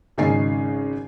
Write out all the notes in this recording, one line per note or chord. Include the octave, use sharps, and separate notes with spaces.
G#1 C#3 C#4 D#4 G#5 C7